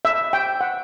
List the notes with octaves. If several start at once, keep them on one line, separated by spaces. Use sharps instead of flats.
E5
G5
F#5